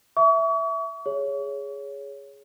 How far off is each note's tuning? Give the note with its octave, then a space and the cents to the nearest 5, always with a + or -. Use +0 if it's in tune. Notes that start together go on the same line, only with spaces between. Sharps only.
E5 +0 C#6 +40
G#4 +0 C#5 +15